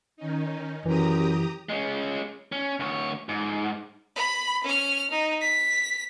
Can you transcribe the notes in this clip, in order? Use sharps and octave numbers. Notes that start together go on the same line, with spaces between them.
D#3 C#4 D#4
F#2 E3 G4 A#5 D#6
G#3 C#4
C#4
D2 C#5
G#2
B5
C#4 F6
D#4
B6